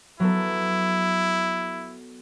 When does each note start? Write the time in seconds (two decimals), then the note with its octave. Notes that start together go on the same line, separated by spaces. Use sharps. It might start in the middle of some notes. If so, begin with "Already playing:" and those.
0.20 F#3 B3 E4 A4